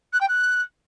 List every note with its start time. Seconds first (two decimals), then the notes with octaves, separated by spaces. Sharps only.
0.13 F#6
0.21 G5
0.28 F#6